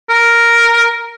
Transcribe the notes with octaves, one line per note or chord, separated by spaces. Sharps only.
A#4